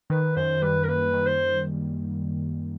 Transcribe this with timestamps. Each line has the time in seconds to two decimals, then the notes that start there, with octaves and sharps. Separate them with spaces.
0.10 D#3 B4
0.36 F#2 C5
0.62 G3 B4
0.84 A#4
0.88 A#3 B4
1.14 D#3
1.27 C5